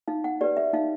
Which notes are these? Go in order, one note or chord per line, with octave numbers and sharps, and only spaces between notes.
D#4 F5
F#5
G4 B4 D5
E5
D#4 F5